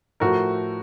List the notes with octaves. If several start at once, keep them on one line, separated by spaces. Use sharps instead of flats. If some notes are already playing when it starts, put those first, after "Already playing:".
A2 F3 A3 F#4 A#4